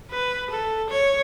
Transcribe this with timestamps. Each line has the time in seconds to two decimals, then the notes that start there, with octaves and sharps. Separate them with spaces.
0.11 B4
0.50 A4
0.89 C#5